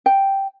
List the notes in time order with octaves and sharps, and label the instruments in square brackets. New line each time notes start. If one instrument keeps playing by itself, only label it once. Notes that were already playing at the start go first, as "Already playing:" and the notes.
[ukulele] G5